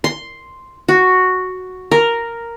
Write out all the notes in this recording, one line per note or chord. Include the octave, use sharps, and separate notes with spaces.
C6
F#4
A#4